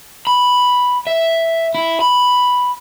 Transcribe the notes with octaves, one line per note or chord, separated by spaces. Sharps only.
B5
E5
E4
B5